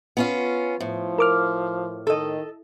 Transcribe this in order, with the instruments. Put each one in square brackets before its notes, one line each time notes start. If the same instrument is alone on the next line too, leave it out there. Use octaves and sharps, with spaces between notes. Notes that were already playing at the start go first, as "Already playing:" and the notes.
[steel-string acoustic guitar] B3 C#4 F4
[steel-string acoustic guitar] A2 [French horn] F3
[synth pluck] A#4 D6 F6
[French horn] D#3 [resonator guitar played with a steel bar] A4 D#5